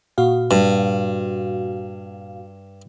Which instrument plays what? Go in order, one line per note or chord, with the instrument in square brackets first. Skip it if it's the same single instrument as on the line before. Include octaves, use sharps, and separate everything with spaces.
[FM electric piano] A#2 F#4 F5
[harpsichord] G2